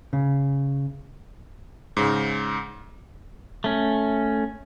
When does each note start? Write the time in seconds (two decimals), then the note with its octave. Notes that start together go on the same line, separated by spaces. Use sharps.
0.13 C#3
1.97 G#2 C#3
3.64 A3 C#4